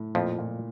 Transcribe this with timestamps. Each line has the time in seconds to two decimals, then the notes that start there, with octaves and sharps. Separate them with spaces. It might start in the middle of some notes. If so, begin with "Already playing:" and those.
Already playing: A2
0.15 F2 A#2 F3
0.39 A#2